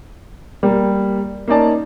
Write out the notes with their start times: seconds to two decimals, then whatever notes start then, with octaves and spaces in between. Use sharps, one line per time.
0.63 G3 A#3
1.48 A#3 C#4 D#4 D5 A5